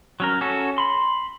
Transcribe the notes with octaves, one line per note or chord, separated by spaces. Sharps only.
F#3 C#4 A#4
C#4 F#4 A4
B5 C6